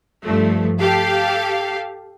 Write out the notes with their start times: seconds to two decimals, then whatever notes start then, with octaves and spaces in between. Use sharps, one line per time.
0.22 G2 F3 A3
0.79 G4 A4 F5